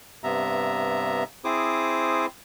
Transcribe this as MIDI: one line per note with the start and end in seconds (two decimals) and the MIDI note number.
0.24 1.23 43
0.24 1.23 48
0.24 1.23 59
0.24 1.23 76
0.24 1.23 82
1.45 2.26 60
1.45 2.26 64
1.45 2.26 68
1.45 2.26 72
1.45 2.26 86
1.45 2.26 87